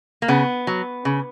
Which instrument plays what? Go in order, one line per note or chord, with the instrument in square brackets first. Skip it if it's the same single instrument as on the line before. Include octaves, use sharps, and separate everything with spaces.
[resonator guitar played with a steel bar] A#3
C#3 B3
F#3
C#3